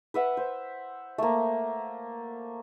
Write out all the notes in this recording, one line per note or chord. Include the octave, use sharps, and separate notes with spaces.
B4 E5 F#5
C5
A3 A#3